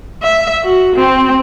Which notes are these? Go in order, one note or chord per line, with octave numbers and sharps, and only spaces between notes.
E5
F#4
C4